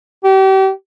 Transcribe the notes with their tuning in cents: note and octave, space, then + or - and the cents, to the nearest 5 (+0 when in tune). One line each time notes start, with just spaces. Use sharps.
G4 -35